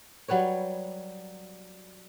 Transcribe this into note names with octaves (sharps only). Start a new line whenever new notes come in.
F#3 G3 B4 C#5